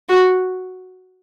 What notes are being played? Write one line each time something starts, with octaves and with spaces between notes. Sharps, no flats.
F#4